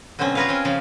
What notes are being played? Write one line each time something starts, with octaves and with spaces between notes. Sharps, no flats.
B2 D3 F#3 C4 C#4
F4 G#4 A#4 B4 C#5 F5
C4 C#4
C#3 F3 F5